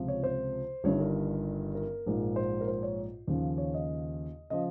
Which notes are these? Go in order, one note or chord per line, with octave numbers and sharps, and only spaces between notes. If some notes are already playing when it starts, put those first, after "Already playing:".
Already playing: C#2 C3 F3
C#5
C5
G1 G2 D#3 C#5
A#4
A#4
A#1 G#2 F3
C5
A#4
C5
C#5
D#2 C#3 F3
C#5
D#5
C#3 F3 D#5